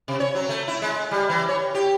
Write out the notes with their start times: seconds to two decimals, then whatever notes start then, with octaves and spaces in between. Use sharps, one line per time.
0.08 C3
0.20 C#5
0.35 F#3
0.49 A3
0.68 E4
0.82 G#3
1.11 G3
1.29 E3
1.49 C#5
1.75 G4